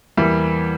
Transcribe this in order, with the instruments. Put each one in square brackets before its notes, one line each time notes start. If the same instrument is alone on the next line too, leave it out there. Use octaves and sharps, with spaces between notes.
[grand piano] E2 E3 G3 A#3